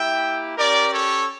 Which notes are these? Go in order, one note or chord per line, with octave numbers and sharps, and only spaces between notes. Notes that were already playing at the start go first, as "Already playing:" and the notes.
Already playing: A#3 E4 G4 E5 G5
C#4 G4 A#4 D5
A4 C#5